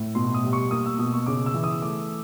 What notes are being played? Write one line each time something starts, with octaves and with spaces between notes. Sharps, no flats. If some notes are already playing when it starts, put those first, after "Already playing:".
Already playing: A2
B2 C6
D#6
G3
C#6
A#3 D#6
E6
B2 D#6
C#6
C#3 D6
E6
E3
D#6
A3 D6